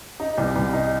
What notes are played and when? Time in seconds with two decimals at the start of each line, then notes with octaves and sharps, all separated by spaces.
0.20 D#4
0.38 C2
0.56 C2
0.73 D#4